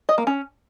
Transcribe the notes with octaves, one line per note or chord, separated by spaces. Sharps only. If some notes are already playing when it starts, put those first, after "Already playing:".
D#5
A#3
C#4